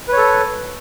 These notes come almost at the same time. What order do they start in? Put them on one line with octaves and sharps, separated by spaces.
B4 C#5 A4